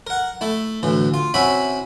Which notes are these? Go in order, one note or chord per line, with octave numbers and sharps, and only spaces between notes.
A#4 F#5
A3 E4
D2 A2 E3
F4
C3 C#4 E4 F#4 E5 B5